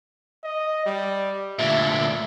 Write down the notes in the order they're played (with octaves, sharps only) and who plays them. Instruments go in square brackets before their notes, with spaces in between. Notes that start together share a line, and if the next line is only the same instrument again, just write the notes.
[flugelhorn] D#5
G3
[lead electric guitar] D2 A#2 [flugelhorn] E5